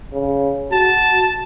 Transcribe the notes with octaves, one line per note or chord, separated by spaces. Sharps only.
C#3
F#4 A5